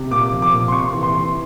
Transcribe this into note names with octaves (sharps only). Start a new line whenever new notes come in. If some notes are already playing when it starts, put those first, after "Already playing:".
Already playing: C3
A#2 D6
F3
D6
A#2
C6
C3 C#6
E3
C6
E3